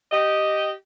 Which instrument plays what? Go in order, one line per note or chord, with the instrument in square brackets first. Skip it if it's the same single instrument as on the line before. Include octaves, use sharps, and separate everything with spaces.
[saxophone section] G4 D#5